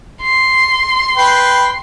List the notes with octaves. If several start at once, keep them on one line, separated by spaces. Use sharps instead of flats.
C6
B4 G5